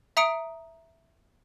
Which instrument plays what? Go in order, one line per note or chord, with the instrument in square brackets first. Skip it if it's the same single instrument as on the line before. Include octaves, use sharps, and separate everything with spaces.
[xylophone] E5 A#5 D#6 C#7 D7